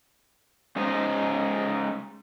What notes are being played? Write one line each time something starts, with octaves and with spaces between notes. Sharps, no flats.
G#3 C#4 D#4 C5 D#5